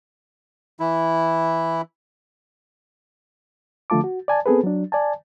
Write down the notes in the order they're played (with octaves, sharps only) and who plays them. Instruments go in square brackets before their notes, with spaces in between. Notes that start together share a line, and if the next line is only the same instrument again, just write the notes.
[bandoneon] E3 E4
[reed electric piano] D3 F3 A3 F4 A5 D6
F#4
D5 G#5 A5
B3 C4 G#4 A4 B4
F#3 D4
D5 G#5 A5